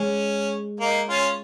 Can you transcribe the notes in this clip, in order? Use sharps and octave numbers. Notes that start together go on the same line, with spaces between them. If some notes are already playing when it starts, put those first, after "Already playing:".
Already playing: G#3 C#4
A#3 D#4
C#4 F4